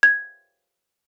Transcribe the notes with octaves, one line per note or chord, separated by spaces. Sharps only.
G#6